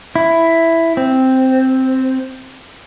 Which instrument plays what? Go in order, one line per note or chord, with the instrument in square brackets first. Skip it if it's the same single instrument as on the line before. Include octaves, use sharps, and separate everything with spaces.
[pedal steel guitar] E4
C4